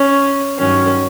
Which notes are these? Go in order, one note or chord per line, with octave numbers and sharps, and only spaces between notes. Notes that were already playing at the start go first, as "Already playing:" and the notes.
Already playing: C#4
G2 D#3 F#3 C#4